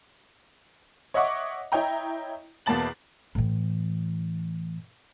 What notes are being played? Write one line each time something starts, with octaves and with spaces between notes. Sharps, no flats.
C#5 D#5 E5 F#5 C#6 D6
E4 C#5 D#5 G5 A#5
E2 B2 A#3 A5 A6 F#7
A2 E3